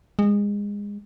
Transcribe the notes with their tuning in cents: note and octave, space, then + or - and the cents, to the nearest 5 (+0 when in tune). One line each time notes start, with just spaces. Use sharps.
G#3 -25